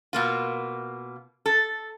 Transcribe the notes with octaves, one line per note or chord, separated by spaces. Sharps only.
B2 A#3 F4
A4